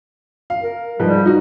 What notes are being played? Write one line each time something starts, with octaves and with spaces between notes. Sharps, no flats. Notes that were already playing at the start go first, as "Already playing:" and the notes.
F5
A#4
G#2 F3 G3 B4
D#4 F#4